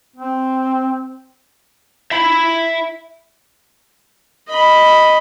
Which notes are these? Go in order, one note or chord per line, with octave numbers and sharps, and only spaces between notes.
C4
E5 B5
D#5 B5